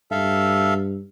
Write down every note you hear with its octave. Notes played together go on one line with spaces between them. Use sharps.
G2 A4 E5 F5